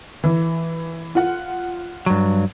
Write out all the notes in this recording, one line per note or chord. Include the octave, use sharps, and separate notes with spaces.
E3
F4 F#5
G2 F#3